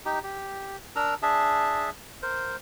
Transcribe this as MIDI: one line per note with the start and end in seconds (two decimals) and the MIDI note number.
0.05 0.19 63
0.05 0.19 67
0.24 0.77 67
0.96 1.14 62
0.96 1.14 70
0.96 1.14 82
0.96 1.14 88
1.22 1.90 62
1.22 1.90 68
1.22 1.90 76
1.22 1.90 81
2.23 2.56 70
2.23 2.56 72